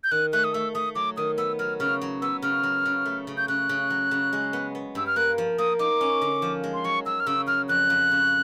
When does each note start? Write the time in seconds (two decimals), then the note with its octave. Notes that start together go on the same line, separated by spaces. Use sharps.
0.04 G6
0.11 D#3 F#6
0.33 A3 F#6
0.44 D#6
0.54 A3 E6
0.75 A3 D#6
0.95 F#3 D6
1.17 D#3 D#6
1.38 B3 E6
1.59 F#3 F6
1.80 C#3 F6
2.01 F#3
2.22 B3 E6
2.42 C#3 F6
2.63 F#3
2.85 C#3
3.06 A3
3.27 C#3
3.37 G6
3.48 C#3 F#6
3.69 C#3
3.90 F#3
4.11 C#3
4.33 G#3
4.53 B3
4.75 B3
4.95 G2 E6
5.07 F6
5.16 A#3 F#6
5.38 F3
5.58 A#3 D#6
5.79 D#4 D6
6.01 C#4
6.22 D3
6.42 F3
6.64 G#3
6.73 C6
6.84 F#3 C#6
7.06 F#3 E6
7.20 F6
7.27 C#3 E6
7.47 F#3 F6
7.69 F2 F#6
7.90 F2
8.11 C#3